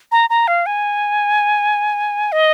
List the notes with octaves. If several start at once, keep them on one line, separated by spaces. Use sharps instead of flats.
A#5
A#5
F5
G#5
D#5